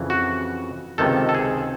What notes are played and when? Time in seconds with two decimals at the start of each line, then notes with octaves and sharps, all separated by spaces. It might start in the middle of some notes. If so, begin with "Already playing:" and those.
Already playing: F2 C#3 E3
0.10 F#4
0.98 C#2 C3 D#3 A4
1.29 A4
1.35 G#4